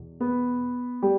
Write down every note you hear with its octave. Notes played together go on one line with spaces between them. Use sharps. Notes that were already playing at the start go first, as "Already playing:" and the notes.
Already playing: E2 B2
B3 B4
G3 G4